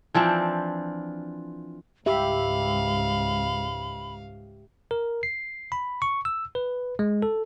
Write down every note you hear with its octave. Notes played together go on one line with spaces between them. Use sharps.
E3 F3 C4 D4
C#2 G#2 G4 E5 F5 B5
A#4
C7
B5
C#6
E6
B4
G#3
A4